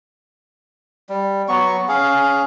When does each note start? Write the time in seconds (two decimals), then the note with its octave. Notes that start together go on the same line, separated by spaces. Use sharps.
1.09 G3
1.49 F#3 B3 C#6
1.88 C#4 G#4 F5